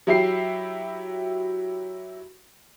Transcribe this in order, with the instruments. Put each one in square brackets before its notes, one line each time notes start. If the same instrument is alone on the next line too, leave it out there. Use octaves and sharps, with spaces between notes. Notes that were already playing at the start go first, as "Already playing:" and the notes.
[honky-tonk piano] F#3 E4 G4 C7